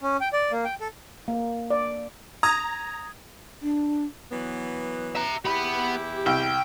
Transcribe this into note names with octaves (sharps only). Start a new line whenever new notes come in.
C#4
G5
D5
A#3
G5
A4
A#3
D5
A#5 D#6 G#6
D4
E3 F#3 B3
E5 A#5
E2 B3 E4 G4 B5
C2 G5